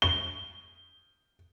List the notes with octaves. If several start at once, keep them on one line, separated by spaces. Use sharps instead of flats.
G7